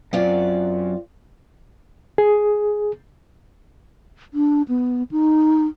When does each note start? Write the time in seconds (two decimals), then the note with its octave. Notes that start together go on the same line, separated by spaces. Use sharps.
0.13 F#2 C4 F4 D5
2.18 G#4
4.34 D4
4.68 B3
5.11 D#4